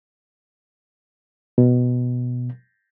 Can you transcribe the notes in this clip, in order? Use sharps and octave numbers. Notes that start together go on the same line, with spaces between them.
B2